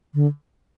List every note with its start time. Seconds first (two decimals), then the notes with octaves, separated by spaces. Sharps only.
0.14 D3